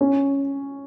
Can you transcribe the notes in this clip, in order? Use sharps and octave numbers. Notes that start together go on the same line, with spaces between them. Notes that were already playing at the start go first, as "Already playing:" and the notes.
C#4